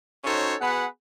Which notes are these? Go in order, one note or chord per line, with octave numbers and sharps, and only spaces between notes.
C#4 D#4 F#4 A4 C5 C#5
B3 F#4 G#4 B4 F#5